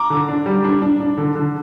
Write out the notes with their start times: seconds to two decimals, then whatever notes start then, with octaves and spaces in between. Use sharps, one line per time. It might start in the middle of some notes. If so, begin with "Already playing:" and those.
Already playing: A#5 D6
0.10 D3
0.29 D4
0.46 G3
0.64 D4
0.82 D4
1.00 D4
1.18 D3
1.35 D3